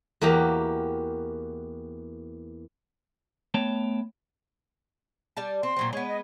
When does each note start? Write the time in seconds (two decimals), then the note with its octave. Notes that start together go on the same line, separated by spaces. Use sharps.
0.21 E2 A#3 F#4 G4 A#5
3.54 A3 B3 C#5 G5 A5
5.37 G3 D5 A5
5.63 C4 C6
5.76 A#2 F#3 C4
5.93 G#3 B3 C#5
6.08 D#5